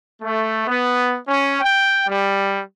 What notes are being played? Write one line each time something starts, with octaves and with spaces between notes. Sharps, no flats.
A3
B3
C#4
G5
G3